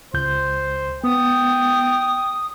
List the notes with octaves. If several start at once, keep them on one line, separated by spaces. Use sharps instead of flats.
C#2 C5 G6
B3 G5 D#6